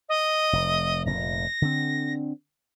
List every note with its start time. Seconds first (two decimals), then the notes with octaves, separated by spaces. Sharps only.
0.09 D#5
0.53 F1
1.06 F1 A#2 A#6
1.62 D3 C4